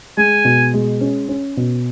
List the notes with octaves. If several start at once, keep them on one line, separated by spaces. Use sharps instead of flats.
G#3 G#5
B2
G#3
C#4
C#4
B2